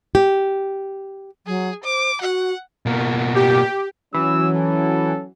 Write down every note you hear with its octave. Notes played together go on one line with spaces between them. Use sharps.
G4
F#3 G#4
C5 D6
F#4 F#5
B2 A#3
G4
E3 F#3 C#4 F#4 E6
A4